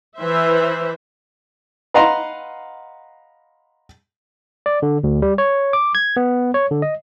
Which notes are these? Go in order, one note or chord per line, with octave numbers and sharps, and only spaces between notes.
E3 C5 E5
B4 D#5 F5 F#5 A#5 C6
D5
D3
D2
G3
C#5
D6
G#6
B3
C#5
D3
D#5